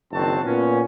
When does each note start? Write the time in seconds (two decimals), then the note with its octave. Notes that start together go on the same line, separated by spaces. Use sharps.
0.12 F#1 D#3 C4 F#4 A5
0.43 A#2 B3 C#4